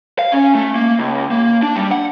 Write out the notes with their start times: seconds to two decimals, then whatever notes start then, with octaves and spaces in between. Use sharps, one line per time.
0.19 F5
0.32 C#4
0.55 A3
0.76 A#3
0.99 C#2
1.31 A#3
1.63 D4
1.76 G3
1.91 F#5